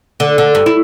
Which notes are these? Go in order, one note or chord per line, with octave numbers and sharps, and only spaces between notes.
D3
D3
G2
E4